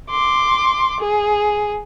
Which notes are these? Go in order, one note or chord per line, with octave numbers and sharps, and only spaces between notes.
C6 D6
G#4